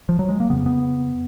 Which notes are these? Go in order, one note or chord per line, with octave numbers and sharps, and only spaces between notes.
F3
F#3
G#3
A#3
F2 C#3 B3
B3